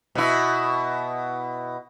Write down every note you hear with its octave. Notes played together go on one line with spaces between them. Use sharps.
B2 E4